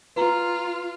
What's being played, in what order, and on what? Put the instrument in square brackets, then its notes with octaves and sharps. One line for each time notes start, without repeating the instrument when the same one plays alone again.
[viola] F4 [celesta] B4 A#5